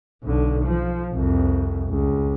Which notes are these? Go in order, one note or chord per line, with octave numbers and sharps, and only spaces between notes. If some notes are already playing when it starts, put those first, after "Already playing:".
B1 D3
F3
C2 F2
C#2